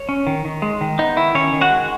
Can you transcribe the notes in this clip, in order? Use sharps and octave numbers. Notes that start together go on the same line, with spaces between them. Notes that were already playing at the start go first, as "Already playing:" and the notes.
Already playing: C#5
C#4
D#3
D#3
G#3
D#3
B3 D#4
D#3 E4
D#3 C#4 C#5
D#3
F#4 F#5
G#3